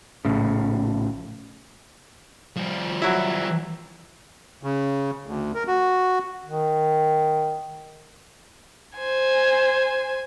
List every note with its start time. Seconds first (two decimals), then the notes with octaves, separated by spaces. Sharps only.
0.25 A#1 A2 C#3
2.57 F3 G3
3.02 F#3 E4
4.63 C#3
5.27 D2
5.54 A#4
5.67 F#4
6.44 D#3
8.98 C5 G#5